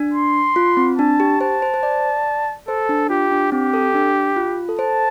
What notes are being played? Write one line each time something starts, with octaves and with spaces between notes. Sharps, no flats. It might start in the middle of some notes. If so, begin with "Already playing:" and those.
Already playing: D4
C6
F4
C4
D4 A5
G4
C5 A5
C5
C5
D5
A4 C5
D4
F4 G4
D4
C4 G4
A4
D4
F4
A4
C5 A5